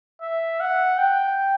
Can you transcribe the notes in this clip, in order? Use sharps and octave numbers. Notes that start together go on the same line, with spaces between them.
E5
F#5
G5